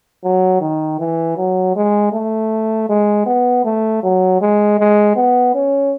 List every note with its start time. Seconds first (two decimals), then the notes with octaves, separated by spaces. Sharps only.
0.24 F#3
0.61 D#3
0.99 E3
1.37 F#3
1.76 G#3
2.13 A3
2.89 G#3
3.26 B3
3.65 A3
4.03 F#3
4.41 G#3
4.79 G#3
5.16 B3
5.55 C#4